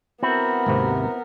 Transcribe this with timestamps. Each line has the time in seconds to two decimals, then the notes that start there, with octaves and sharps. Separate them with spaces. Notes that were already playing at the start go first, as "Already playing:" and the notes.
0.23 B3 C4 E4 F#4 A#4
0.66 G#1 D#2 C3